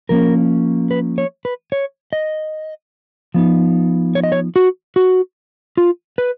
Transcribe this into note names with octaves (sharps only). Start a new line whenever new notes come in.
F3 A#3 C#4 A#4
B4
C#5
B4
C#5
D#5
F3 B3 D#4
C#5
D#5
C#5
F#4
F#4
F4
B4